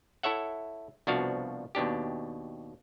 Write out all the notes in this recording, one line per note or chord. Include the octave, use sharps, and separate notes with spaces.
E4 A4 C#5 E5 F#5
C2 B2 F3 D4 F#4 F5
D#2 B2 D4 G4